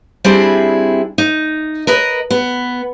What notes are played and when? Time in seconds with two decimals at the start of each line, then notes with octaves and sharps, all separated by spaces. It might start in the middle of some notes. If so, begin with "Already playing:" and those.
0.24 G3 C4 D4 E4 G#4
1.18 D#4
1.87 A#4 B4 D#5
2.31 B3